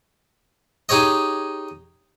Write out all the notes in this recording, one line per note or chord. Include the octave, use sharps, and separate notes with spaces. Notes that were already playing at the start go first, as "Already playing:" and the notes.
D#4 G4 G#4 C#5 D#5